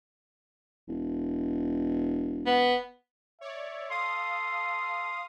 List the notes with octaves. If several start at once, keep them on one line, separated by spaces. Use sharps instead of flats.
E1
B3
C#5 D5 E5
A4 F5 C6 D#6